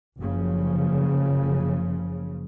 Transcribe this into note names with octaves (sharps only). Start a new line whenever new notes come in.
F#1 C#3 F3